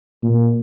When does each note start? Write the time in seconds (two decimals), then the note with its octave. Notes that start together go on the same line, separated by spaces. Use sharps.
0.23 A#2